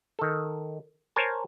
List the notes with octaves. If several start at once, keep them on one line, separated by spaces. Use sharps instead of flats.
D#3 A4
A#4 C5 C#5 G#5 A5